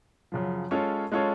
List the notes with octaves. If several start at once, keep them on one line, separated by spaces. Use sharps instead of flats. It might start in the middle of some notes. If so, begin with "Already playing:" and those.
F#2 C#3 F3
G#3 C#4 F4 A4 C#5
G#3 C#4 F4 A4 C#5